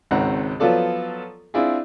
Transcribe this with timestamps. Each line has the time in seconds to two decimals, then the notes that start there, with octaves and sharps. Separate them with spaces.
0.11 G#1 C#2 D#3 C4 F#5 A#5
0.60 F3 F#3 B3 F4 A4 D5
1.54 C4 D4 E4 F4 G#4